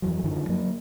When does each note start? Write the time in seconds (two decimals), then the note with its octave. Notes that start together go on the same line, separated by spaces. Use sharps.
0.02 F2 E3 F#3
0.24 F#2 D3 D#3 F3
0.49 F#3 A#3